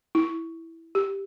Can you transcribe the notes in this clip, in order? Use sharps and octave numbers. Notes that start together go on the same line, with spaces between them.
E4
G4